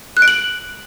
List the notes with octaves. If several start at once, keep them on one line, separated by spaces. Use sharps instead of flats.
F#6
D7
F#7